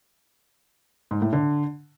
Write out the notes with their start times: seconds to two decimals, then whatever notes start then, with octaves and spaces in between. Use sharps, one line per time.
1.11 G#2
1.22 A2
1.33 D3